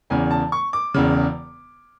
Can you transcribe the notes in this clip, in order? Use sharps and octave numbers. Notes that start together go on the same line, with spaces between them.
E1 E2 C#3 G#5
A5
C#6
D6
E1 E2 C#3